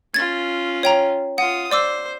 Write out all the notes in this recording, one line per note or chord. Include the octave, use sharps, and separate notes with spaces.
C#4 F4 G#6 A6
C#5 G5 A#5
F4 F#5 D#6
C5 D5 D6 E6